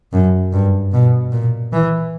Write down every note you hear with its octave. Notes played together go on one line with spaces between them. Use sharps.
F#2
G2
B2
A#2
E3